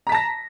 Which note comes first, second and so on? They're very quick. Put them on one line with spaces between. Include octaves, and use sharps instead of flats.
A#5 B6 A5 A#6